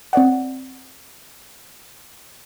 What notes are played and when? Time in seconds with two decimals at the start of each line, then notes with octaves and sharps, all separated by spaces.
0.13 C4 C#5 D5 F#5